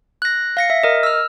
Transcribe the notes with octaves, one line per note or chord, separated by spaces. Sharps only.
F#6 A#6
F5 A#6 C#7
E5
A#4 D#5
E6 F6